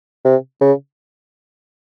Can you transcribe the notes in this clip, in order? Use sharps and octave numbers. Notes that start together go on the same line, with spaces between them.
C3
C#3